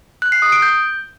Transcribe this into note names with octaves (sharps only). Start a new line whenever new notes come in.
F#6
C7
D#6
D7
G6